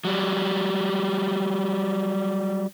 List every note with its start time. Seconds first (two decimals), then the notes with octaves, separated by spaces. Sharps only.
0.05 F#3 G3